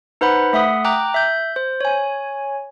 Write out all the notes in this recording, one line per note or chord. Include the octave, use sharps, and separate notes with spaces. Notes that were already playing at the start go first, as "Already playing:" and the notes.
D#4 B4 C5 F#5 B5
A3 E5 F#5 D#6
G5 A#5 D6 F#6
E5 G6
C5
C#5 G#5